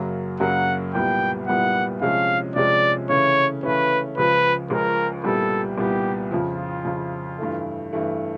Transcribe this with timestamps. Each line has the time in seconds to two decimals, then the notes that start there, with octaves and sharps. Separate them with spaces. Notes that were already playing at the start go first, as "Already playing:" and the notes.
Already playing: F#2 C#3 F#3 A#3
0.40 F#2 C#3 F#3 A#3 F#5
0.94 C2 A#2 G3 B3 G5
1.48 C2 A#2 G3 B3 F#5
2.01 C3 F3 G#3 C#4 F5
2.56 C3 F3 G#3 C#4 D5
3.09 C#3 E3 A3 C#4 C#5
3.63 C#3 E3 A3 C#4 B4
4.17 C#2 C#3 F3 G#3 B4
4.70 C#2 C#3 F3 G#3 A#4
5.24 C2 A#2 G3 B3 A4
5.77 C2 A#2 G3 B3 G4
6.31 F2 C#3 F3 F4
6.85 F2 C#3 F3
7.38 G2 E3 A3
7.93 G2 E3 A3